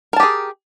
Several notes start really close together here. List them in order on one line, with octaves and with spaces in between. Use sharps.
A#4 A5 G4 G#4